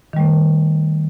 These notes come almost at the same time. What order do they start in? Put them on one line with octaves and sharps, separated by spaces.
D#3 G3 A3